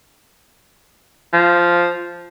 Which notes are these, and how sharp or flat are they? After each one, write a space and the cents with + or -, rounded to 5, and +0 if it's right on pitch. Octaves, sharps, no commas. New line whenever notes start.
F3 -5